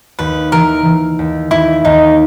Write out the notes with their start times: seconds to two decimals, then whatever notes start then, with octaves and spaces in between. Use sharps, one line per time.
0.19 D#2 B4
0.52 E3 A#4
0.85 E3
1.19 D#2
1.51 D#2 E4
1.85 D#2 D#4